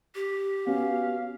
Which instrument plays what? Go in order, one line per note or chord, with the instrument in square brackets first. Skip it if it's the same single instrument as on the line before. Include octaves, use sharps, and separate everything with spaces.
[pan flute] G4
[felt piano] B3 C#4 F#4 [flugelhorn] F5